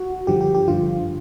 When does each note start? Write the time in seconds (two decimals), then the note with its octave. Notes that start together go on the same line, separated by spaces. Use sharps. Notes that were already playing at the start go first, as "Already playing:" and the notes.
Already playing: F#4
0.27 G2 D3 F3 G4
0.41 G4
0.55 G4
0.68 G2 D3 F3 F4